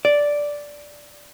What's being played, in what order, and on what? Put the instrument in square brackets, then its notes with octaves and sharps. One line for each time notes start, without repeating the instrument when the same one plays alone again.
[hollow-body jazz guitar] D5